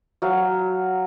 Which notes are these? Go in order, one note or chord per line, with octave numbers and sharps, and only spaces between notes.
F#3 F5